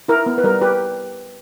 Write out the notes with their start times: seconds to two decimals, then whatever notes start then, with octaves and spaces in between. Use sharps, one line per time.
0.08 E4 A#4
0.26 B3
0.38 B4
0.44 G3 A#4
0.62 G4 B4